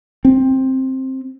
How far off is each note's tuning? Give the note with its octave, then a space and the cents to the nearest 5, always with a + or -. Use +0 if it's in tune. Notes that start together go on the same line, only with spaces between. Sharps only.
C4 +10